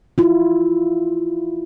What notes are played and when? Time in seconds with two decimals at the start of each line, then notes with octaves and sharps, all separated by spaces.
0.18 E4 F4